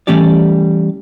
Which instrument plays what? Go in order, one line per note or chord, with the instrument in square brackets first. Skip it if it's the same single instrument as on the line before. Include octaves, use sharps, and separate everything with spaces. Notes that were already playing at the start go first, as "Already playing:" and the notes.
[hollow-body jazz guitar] E3 G3 A3 C#4 G4 D5